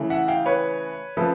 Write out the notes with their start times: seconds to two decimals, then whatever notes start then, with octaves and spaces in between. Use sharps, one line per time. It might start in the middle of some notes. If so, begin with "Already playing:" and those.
Already playing: C#3 E3 A3
0.10 E5 F#5
0.28 F5 G5
0.46 B4 C#5
1.17 C#3 F3 A3 A4 B4